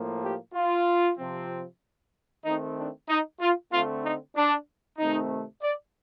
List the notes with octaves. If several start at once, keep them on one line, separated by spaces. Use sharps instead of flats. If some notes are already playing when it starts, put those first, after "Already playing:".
Already playing: A2 F3 A#3
G4
F4
C3 F3 C4
D#3 A3 C4 D#4
D4
D#4
F4
D3 A3 C4 F4
D#4
D4
C3 D#3 A3 C4 D#4
D5